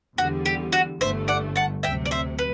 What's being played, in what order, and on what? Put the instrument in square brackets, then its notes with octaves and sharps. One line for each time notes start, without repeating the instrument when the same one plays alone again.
[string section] E2 D3 G3 [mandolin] F#4
[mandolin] G4
F#4
[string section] G1 G2 D3 A3 [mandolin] C5 E5
[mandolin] D5 F#5
F#5 A5
[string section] D2 C3 F#3 [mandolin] E5 G5
[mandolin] D5
C5 E5
B4